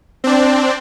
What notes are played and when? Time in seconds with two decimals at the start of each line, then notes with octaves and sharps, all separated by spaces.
0.24 C4 D4